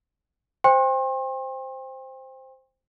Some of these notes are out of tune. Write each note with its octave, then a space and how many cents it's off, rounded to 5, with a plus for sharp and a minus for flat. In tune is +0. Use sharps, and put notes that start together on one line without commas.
C5 +0 G5 +30 C6 +40